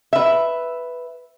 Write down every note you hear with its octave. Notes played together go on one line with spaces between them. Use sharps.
B4 E5